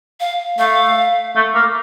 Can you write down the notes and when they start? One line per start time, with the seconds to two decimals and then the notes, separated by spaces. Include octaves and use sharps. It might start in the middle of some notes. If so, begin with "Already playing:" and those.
0.20 F5
0.58 A3 F5
1.35 A3
1.55 A#3